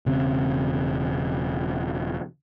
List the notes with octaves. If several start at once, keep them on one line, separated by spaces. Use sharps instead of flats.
E1 C#3 C4